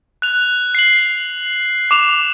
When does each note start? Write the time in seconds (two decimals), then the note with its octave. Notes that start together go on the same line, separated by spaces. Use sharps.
0.22 F#6 F7
0.75 C7 F#7
1.91 D6 E7 F7